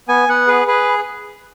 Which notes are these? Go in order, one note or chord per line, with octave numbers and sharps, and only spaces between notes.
B3 G#5
B3 F#5
G#4 B4
G#4 B4